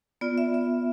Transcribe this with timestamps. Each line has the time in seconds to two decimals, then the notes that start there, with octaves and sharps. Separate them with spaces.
0.21 B3 F4 D5
0.38 E5
0.54 E5